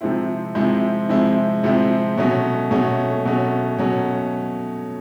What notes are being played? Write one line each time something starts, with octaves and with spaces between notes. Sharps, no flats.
C3 F3 G#3 C4 E4
C3 F3 G#3 C4 E4
C3 F3 G#3 C4 E4
C3 F3 G#3 C4 E4
B2 F#3 A3 C#4
B2 F#3 A3 C#4
B2 F#3 A3 C#4
B2 F#3 A3 C#4